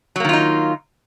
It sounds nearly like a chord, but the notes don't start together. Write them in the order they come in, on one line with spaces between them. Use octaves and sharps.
F#3 A#3 D#3 F4 D#4